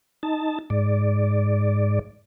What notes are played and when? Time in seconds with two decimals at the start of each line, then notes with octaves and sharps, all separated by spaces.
0.23 D#4 A5
0.70 G#2 D5